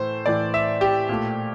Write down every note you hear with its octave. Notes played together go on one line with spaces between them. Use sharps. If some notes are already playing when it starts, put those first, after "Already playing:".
Already playing: A2 E3 A3 C5
A2 E3 A3 D5
E5
G4
A#2 A3